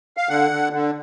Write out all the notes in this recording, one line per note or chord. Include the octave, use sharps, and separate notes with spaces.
F5
D3 F#5
D3
D3